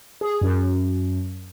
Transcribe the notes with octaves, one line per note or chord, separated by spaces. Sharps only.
G#4
F#2